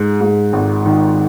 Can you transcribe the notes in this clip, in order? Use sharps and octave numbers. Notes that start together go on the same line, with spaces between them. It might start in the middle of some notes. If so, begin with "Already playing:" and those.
Already playing: G#2 G#3
G#2
G#1
D#3